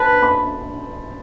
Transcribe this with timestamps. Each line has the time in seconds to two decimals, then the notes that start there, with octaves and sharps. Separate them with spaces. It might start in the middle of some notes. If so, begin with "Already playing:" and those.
Already playing: B4 C5 A5
0.22 B5